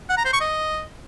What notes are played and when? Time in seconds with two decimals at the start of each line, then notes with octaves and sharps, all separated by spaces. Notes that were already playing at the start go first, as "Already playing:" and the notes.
0.09 F#5
0.17 A#5
0.25 C5
0.33 C#6
0.41 D#5